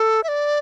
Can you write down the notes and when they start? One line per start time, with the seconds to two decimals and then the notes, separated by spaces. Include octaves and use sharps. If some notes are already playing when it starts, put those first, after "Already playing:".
Already playing: A4
0.24 E5
0.28 D5